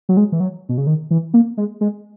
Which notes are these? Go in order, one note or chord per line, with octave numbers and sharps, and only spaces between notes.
F#3
G#3
E3
F#3
B2
C#3
D#3
E3
A#3
G#3
G#3